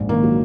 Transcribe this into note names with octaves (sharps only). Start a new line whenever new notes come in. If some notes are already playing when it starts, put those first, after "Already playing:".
Already playing: A#1 G#2
D#3 A#3
F#3